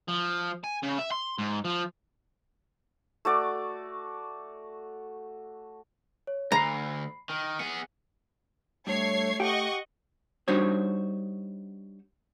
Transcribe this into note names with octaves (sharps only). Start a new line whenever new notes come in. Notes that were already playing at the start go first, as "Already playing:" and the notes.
F3
G#5
C#3
E5
C6
G#2
F3
A3 F#4 D5
C#5
D2 A#5 B5 C7
D#3
B3 G#4 C#7
G2 A3 C#5 G#6 C7
G4 D#5 F#5 C#6
G3 D4 D#4 F#4 C5 C#5